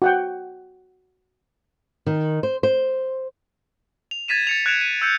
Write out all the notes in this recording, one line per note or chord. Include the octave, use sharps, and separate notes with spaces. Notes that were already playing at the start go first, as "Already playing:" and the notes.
F#4 F#5 G5
D#3
C5
C5
F7
G#6 A6 B6 D#7 E7
A6 C#7 F7
F#6 G#6 C#7 D7 E7 F7
D#7
E6 G6 C#7